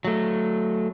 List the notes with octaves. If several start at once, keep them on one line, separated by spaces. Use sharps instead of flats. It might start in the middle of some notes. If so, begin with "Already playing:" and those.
F#3 A3